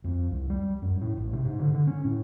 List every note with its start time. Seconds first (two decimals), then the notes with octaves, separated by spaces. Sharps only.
0.04 F2
0.31 C2
0.50 G3
0.82 F#2
1.01 A2
1.17 A1
1.33 C3
1.45 G#2
1.59 D3
1.74 D3
1.87 C#4
2.05 A2